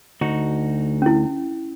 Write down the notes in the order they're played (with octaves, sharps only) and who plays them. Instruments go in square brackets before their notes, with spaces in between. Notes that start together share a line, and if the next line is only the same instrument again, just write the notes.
[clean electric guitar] D2 D#4 F#4
[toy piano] C#4 E4